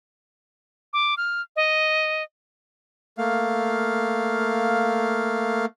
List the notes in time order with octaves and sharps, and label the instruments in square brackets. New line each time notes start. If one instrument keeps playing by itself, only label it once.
[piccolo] D6
F6
D#5
[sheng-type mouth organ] A3 A#3 F5